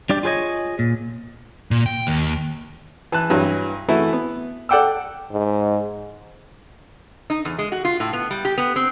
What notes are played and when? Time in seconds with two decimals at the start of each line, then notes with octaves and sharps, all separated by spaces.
0.09 G3 D4 G4 D5
0.23 F4 G#4 B4 C#5 D#5
0.79 A#2
1.71 A#2
1.86 G5
2.07 D#2
3.12 E3 A5 F#6
3.30 G2 E3 F#3
3.89 E3 A3 E4 F#4
4.13 B3
4.69 A4 D5 F#5 G5 D6 E6
5.32 G#2
7.30 D#4
7.45 E2
7.59 G#3
7.72 F#4
7.85 F4
8.00 A2
8.13 B3
8.30 G3
8.45 G4
8.58 B3
8.76 C4